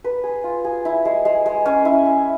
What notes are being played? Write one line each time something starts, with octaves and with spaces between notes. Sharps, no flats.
B4
G#4
F4
G#4
E4
G#3
G#3
G#3
C#4
E4
C#4